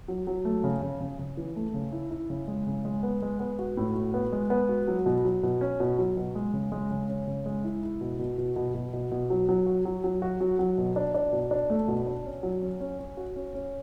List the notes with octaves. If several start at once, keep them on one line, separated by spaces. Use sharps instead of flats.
F#3
F#3
A3
C#3
C#3
C#3
C#3
E3
A3
C#3
E4
E4
C#3
G#3
C#3
G#3
B3
G#3
B3
F#4
A2
F#4
B3
G#3
B3
F#4
F#3
B2
F#3
B2
C#4
B2
F#3
B2
G#3
C#3
G#3
C#3
C#4
C#3
G#3
E4
E4
B2
B2
B2
B2
B2
B2
B2
F#3
F#3
F#4
F#3
F#3
F#4
F#3
F#3
B2
D4
D4
B2
D4
A3
B2
D4
C#4
F#3
C#4
C#4
C#4
F#4
C#4
C#4